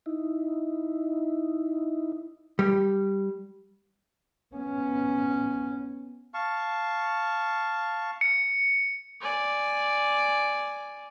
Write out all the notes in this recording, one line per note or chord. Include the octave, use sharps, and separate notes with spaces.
D#4 E4
G3
B3 C#4
F5 A5 C#6
C#7
D5 G#5